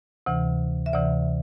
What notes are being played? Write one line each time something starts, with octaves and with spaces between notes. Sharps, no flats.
D2 C3 E3
E5
D2 C3 E3 D5